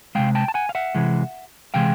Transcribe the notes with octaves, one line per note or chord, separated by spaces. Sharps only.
C3 E3 G#3 F5 G5
G5 A5
A5
F#5 G#5
F5
E5 F#5
C3 E3 G#3
C3 E3 G#3 F5 G5